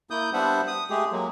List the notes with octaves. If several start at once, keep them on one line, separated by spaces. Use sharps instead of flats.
A#3 E4 D#6 G6
G3 B3 D4 C5 E5 F#5
D#6
G#3 A3 G4 G#4
F#3 G#3 A#3